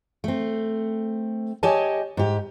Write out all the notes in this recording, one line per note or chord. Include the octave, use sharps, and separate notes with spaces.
A3 C4
G4 C#5 D#5 G#5 A5
G#2 G4